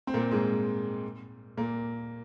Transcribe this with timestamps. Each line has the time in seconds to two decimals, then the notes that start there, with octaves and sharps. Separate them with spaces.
0.07 C4
0.14 A#2 A#3
0.31 G#2 G#3
1.57 A#2 A#3